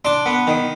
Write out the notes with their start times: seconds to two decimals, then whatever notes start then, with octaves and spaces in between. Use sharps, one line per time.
0.05 D4 C6
0.26 B3
0.47 D#3